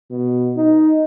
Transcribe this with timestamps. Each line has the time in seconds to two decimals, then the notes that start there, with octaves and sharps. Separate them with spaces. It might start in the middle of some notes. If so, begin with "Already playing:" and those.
0.11 B2
0.57 D#4